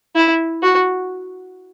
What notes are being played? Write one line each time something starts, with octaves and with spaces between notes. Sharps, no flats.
E4
F#4